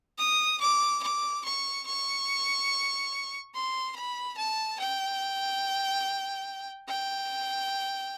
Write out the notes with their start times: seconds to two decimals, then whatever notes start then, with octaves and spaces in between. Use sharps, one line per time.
0.18 D#6
0.61 D6
1.03 D6
1.44 C#6
1.86 C#6
3.54 C6
3.96 B5
4.37 A5
4.79 G5
6.88 G5